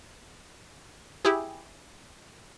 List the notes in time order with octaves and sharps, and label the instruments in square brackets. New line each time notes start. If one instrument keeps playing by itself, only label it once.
[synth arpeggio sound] E4 G4 G#4